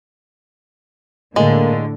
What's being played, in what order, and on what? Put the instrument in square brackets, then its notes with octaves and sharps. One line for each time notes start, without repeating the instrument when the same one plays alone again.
[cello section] A2 D3 [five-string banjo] G#3 [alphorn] A#3